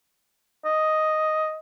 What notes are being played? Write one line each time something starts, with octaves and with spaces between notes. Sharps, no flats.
D#5